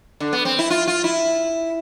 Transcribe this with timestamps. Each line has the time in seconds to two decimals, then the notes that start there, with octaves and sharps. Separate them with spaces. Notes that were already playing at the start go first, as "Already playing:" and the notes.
0.20 D3
0.33 B3
0.45 C4
0.59 E4
0.70 F4
0.87 F4
1.04 E4